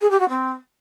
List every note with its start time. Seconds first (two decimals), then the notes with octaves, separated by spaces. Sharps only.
0.01 G#4
0.10 G4
0.20 F#4
0.29 C4